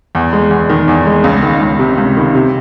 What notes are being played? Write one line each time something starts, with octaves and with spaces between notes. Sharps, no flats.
E2
G#3
E2
D#3
E2
G#3
C#2
D#3
C#2
C3
C#2
D#3
C3